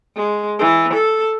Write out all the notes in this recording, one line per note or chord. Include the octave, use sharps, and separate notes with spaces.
G#3
E3
A4